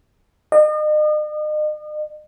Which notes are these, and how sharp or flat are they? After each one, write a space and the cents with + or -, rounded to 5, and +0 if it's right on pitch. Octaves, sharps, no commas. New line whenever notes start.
D#5 -40